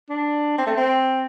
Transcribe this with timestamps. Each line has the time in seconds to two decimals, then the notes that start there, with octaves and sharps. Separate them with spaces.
0.09 D4
0.58 C4
0.66 A3
0.76 C4